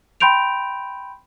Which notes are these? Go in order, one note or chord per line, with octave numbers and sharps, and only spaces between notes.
G5 B5 C6 G6 D7 F7